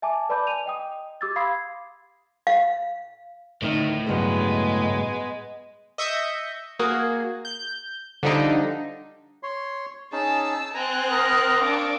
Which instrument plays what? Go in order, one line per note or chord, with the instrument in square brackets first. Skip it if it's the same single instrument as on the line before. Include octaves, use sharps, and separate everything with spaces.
[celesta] E5 G#5 A5 D6
B4 D5 A5 B5 D6 G6
G#5 D#7 F7
D#5 G5 D#6
G4 D6 E6 G#6 A6
F5 B5 C6 D#6 G#6 C7
[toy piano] F5
[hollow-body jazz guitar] D2 D#3 D#4 [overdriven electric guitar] A2
[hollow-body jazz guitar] C#2 G2 F#3 [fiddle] G#3 B3
[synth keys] D#5 E5 C#6 D#6 G6
A#3 F#4 G#4
G6
D3 F3 G3 D4 D#4
[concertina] C#5 C6
[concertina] C#4 D#4 G#4 [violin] A5 E6
[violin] C4 F#6 [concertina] G#5 A#5
[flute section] A#4 D#6
[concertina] C4 F5 C#6 [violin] D4 D6